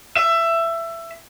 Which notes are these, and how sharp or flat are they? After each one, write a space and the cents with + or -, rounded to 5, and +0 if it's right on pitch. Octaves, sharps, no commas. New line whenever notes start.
E5 +20